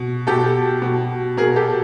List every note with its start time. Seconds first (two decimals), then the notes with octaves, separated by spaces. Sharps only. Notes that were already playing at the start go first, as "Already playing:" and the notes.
Already playing: B2
0.27 B2 G4 A4
0.82 B2
1.37 B2 G#4 A#4
1.56 G4 A4